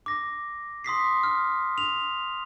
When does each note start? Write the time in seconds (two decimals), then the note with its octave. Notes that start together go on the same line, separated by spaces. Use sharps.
0.06 D6 A#6
0.84 C6 D#6 B6 C7
1.23 F6
1.78 F7